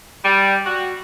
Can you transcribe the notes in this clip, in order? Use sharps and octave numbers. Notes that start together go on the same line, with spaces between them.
G3
F#4